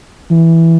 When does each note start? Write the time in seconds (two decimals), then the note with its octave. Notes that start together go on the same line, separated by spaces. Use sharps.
0.31 E3